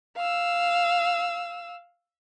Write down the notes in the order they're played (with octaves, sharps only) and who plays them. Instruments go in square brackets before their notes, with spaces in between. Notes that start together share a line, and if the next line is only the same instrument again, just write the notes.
[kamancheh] F5 E6